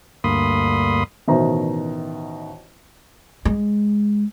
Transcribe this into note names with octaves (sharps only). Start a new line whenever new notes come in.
D2 G2 A#3 B5 C6 D#6
A1 B2 D#3 C5 E5 A#5
G#3